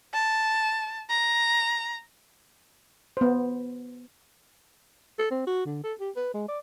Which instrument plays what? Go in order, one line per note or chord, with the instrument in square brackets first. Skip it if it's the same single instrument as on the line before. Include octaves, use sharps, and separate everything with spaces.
[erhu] A5
A#5
[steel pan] B3 C5
[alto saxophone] A4
C4
F#4
D3
A4
G4
B4
G#3
D5